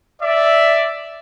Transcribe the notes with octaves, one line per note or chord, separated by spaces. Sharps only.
D5 E5